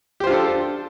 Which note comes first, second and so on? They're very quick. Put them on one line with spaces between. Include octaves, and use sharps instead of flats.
G4 C5 F4 D4 A4